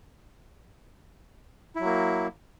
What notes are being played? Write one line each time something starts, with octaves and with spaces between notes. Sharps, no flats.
F#3 A#3 E4